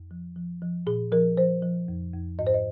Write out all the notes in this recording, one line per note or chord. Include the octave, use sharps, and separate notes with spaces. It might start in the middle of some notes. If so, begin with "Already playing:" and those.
Already playing: F2
F3
F3
F3
A#2 G#4
F3 A#4
F3 C5
F3
F2
F2
G#2 D#5
C5
D#5